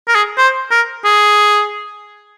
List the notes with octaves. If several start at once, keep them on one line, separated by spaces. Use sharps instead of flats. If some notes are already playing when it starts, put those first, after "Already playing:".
A#4
G#4
C5
A#4
G#4